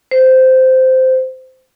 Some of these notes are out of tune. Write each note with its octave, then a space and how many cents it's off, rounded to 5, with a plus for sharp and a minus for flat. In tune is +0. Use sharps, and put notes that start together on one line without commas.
C5 -10